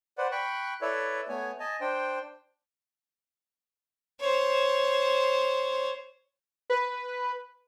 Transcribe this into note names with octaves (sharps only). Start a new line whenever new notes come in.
B4 C5 D5 F#5
G5 B5 C#6 F#6
E4 A4 B4 C#5 D5 E5
A3 B3 C#5 G#5
D#5 G#5 A5
D4 C5 G5
C5 C#5
B4